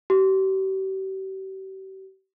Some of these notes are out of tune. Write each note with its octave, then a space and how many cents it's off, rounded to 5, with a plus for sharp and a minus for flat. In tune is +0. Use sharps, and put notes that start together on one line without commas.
G4 -40